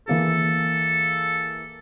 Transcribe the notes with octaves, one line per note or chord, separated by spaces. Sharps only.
E3 A#3 G#4 A4